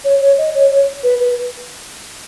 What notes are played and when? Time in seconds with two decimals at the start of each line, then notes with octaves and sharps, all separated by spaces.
0.04 C#5
0.21 C#5
0.38 D#5
0.55 C#5
0.71 C#5
1.03 B4
1.20 B4